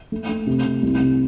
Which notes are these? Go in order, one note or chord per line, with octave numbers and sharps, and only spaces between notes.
A3
A3
C3
C3
C2
C3